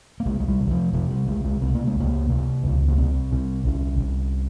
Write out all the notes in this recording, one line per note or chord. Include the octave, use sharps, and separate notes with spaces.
A#3
C2 G#3
G#3
G3
C3
D#3
F3
C3 F3
G3
C2 G#3
G#3
C3 C4
A#3
G#3
C#2 A#3
C3 A#3
C#2
A#3
C2 C4
C3
C2 C#4
C2